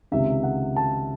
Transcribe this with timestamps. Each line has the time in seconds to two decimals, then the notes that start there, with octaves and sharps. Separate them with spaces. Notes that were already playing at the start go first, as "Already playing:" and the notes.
0.12 C#2 C3 D#3 E5
0.43 F#5
0.76 A5